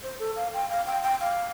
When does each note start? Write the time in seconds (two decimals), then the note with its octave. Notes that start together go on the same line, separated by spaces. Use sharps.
0.03 C5
0.20 A4
0.36 F5
0.54 G5
0.70 F5
0.86 G5
1.03 G5
1.20 F5